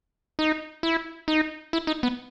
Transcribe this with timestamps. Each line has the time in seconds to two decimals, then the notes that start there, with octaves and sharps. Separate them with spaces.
0.39 D#4
0.83 E4
1.28 D#4
1.73 E4
1.87 D#4
2.03 B3